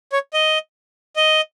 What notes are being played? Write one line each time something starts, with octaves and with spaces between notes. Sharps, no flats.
C#5
D#5
D#5